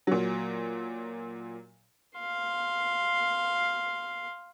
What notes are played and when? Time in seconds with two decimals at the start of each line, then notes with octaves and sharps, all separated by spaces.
0.07 A#2 F#3
2.19 F5 C6